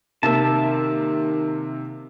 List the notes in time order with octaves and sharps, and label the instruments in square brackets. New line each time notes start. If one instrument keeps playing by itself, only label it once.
[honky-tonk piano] C3 A#3 [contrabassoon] D#3 [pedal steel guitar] E5 A5